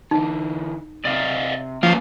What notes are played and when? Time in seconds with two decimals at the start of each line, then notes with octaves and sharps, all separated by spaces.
0.11 D3 E3 D#4
1.05 C3 D5 D#5 F5
1.83 F3 A#3 C#4 F4 B4